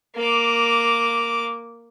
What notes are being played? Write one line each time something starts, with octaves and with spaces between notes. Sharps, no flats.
A#3 D6